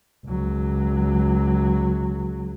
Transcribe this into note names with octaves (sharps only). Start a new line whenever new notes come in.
C#2 F#3